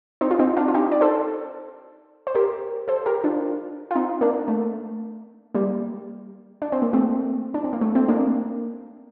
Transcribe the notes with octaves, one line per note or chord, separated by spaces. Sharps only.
C4 D#4
F4
C4 D#4
D4 F4
F4
D#4 G4
D5
A4 C5
C5
G4 A#4
A4 C5
G4 A#4
D4 F4
F4
C4 D#4
A#3 D4
A3
G3 A#3
D4
C4
A#3
A3 C4
D4
C4
A#3
A3
A3 C4
A#3 D4